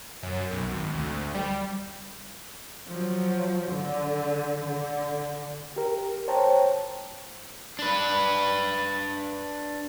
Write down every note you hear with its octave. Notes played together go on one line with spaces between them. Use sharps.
F#2
B1
G#1
D2
G3
F3 F#3
D3
D3
G4 A#4
C5 C#5 G5 A5 A#5
D4 B4